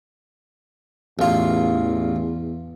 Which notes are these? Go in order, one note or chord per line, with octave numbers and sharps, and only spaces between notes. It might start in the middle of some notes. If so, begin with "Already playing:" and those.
A1 E2 F4